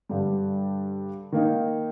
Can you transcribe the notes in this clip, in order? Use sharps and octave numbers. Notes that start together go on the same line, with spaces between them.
G2 D3 G3
D#3 A#3 D#4